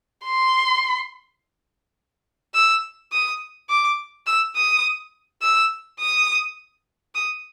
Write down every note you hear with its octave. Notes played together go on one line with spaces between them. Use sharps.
C6
E6
D#6
D6
E6
D#6
E6
D#6
D#6